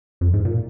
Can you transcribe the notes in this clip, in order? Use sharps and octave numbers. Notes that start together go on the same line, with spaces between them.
F2
G#2
A#2